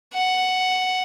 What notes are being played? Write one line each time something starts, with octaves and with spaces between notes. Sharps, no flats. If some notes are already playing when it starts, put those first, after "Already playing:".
F#5